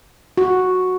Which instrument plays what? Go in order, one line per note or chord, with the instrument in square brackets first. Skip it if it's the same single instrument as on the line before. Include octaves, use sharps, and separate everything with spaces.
[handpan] F#4